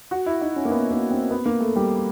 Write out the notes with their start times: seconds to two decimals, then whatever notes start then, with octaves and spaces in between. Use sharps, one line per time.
0.11 F#4
0.26 E4
0.41 D#4
0.56 C#4
0.65 A#3
0.71 B3
0.91 A#3
1.11 C4
1.31 B3
1.46 A#3
1.60 A3
1.76 G3